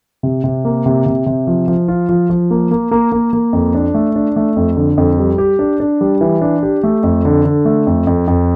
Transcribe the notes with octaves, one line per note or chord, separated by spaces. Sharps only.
C3
C3
A#3
C3
C3
C3
F3
F3
F4
F3
F3
A#3
A#3
A#3
A#3
A#3
F2
D4
A3
D4
A3
F2
D3
F2
G3
G4
D4
D4
G3
E3
D4
G4
A3
F2
D3
D3
A3
F2
F2
F2